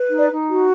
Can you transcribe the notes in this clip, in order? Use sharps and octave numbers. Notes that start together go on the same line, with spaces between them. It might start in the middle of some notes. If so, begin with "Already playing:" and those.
Already playing: B4
D#4
D5
D#4
F#4